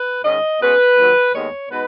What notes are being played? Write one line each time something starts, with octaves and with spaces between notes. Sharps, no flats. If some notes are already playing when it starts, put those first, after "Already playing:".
Already playing: B4
G#2 D#3 G#3 C#4 D#5
B2 G#3 C#4 B4
D#2 D#3 F#3
D#2 D#3 G#3 B3 D#4 C#5
B2 G#3 B3 D#4 B4